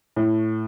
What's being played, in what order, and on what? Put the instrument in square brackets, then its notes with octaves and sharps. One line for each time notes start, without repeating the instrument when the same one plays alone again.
[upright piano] A2